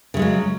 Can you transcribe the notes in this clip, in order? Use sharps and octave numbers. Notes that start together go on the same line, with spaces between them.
C#3 F#3 G#3 A3